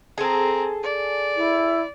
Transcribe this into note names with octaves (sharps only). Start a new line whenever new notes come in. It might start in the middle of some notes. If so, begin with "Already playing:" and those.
C4 G#4 A4 A#5
D5
E4